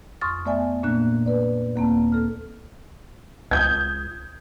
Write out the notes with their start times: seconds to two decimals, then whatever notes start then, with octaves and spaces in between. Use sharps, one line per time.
0.21 F2 C6 C#6 D#6 F6 A6
0.46 A3 B3 D5 E5 G#5
0.83 A#2 A#3 D4 F#6
1.26 B4 D5
1.76 D#2 A#3 C4 A5
2.12 A4 F6
3.51 C#2 D#6 G6 G#6